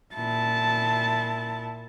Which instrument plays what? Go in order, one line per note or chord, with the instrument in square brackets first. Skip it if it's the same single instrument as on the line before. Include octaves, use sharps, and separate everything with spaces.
[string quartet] A#2 E4 [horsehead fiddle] A5